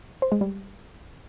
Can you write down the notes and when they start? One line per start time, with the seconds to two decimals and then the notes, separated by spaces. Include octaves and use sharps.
0.22 C5
0.32 G#3
0.41 G3